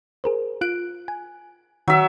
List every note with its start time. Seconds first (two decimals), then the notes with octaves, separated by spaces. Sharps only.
0.24 G#4 A#4 C5
0.61 F4 F#6 D7
1.08 G#5
1.88 D#3 F#3 E5